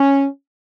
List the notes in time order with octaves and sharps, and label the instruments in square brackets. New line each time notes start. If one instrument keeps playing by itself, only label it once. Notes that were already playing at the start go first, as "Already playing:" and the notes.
Already playing: [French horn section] C#4